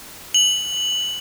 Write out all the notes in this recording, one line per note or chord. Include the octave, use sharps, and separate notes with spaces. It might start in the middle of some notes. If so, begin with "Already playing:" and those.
F#7